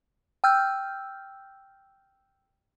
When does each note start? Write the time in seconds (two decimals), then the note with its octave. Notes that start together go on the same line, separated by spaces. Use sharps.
0.44 G5 E6 F6 G6